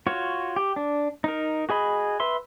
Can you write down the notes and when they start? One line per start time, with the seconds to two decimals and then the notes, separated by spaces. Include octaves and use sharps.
0.07 F4 F#4 C#5
0.56 G4
0.76 D4
1.24 D#4 A#4
1.69 F#4 G#4 D#5 B5
2.20 B4 E5 C6